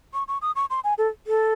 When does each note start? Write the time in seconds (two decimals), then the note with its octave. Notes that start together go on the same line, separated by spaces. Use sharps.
0.14 C#6
0.28 C#6
0.42 D#6
0.56 C#6
0.70 C6
0.84 G#5
0.98 A4
1.27 A4